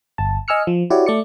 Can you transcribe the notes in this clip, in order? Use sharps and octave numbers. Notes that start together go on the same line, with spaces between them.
G1 A5
D#5 G#5 E6 F6 C#7
F3
E4 F#4 G4 C#5 D5
A3 D5 C#7